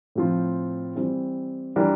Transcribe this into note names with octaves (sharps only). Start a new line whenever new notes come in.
A2 F3 C4 F4
E3 G3 C4
E3 G3 D4 F4 A#4